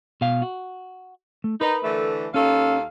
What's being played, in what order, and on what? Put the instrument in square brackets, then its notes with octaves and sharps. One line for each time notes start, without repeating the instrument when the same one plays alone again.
[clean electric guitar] B2 F5
F#4
A3
[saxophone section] D#4 [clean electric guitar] A#4 B4
[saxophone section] D3 E3 A3
[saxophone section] D#2 A4 F5 [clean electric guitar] C#4